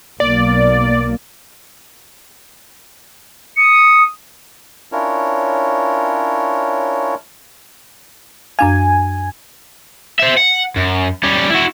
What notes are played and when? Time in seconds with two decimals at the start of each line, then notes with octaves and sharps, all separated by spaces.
0.20 B1 A#3 D5
3.57 D#6 C#7
4.92 C#4 D4 E4 F4 A#4 C#5
8.59 F#2 D4 F5 G#5
10.20 C5 E5
10.38 F#5
10.76 F#2
11.23 G3 C#4
11.50 E4 F#4